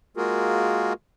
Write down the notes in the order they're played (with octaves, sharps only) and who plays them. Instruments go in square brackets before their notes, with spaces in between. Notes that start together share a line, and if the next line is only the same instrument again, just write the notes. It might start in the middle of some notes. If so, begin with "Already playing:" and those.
[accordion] G#3 A#3 F4 F#4 G#4 A#4